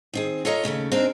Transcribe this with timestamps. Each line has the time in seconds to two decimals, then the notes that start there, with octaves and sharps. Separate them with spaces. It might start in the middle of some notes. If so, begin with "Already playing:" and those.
0.13 D#3 C4 G#4
0.45 F4 A4 C#5 D#5 A#5
0.64 D#2 C#3 A3 C#4
0.92 C4 D4 D#4 G#4 A#4